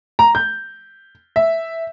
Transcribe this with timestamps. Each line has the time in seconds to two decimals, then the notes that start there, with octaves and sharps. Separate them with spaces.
0.19 A#5
0.35 G6
1.36 E5